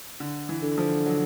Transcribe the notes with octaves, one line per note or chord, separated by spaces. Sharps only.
D3
E3
D3
F3
F#3